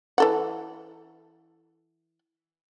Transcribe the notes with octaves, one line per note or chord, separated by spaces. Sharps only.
E3 A4 F#5